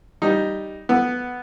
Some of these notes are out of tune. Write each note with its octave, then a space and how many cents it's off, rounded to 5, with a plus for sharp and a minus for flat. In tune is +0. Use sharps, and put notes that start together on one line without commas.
G3 +0 D#4 +0
B3 +0 A4 -5